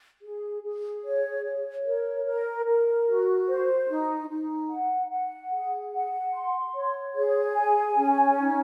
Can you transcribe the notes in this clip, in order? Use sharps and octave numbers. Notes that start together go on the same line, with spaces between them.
G#4
G#4
C#5
C#5
A#4
A#4
A#4
F#4
C5
D#4
D#4
F#5
F#5
G#4
F#5
C6
C#5
G#4
G#5
C#4
D#4